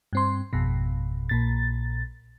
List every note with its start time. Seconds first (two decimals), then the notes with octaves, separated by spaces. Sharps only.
0.13 G2 C4 C6
0.53 G#1 F2 B2
1.29 A#1 A#2 A6